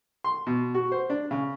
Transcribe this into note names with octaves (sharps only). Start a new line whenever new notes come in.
C6
B2
F#4
C5
D4
C#3